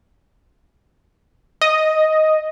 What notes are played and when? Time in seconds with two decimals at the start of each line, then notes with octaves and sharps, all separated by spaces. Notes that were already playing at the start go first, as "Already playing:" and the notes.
1.61 D#5